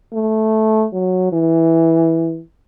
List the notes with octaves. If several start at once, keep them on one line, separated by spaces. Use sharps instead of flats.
A3
F#3
E3